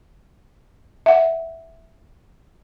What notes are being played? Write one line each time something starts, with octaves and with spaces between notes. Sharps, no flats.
E5 F#5